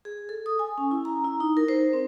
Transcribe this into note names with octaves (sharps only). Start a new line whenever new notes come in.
G#4
A4
D#6
G#5
C#4
E4
A#5
E4
D#4
A#4
C5
C4